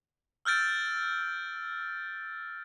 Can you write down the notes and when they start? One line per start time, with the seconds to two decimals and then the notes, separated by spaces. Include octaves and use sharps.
0.45 E6 F6 G6 A6 D7